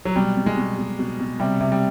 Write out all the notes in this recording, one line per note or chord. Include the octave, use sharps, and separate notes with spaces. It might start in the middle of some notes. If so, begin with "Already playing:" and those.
F#3
B2 G3
B2
G#3
B2
B2
B2
B2
C3 G3
C3
G3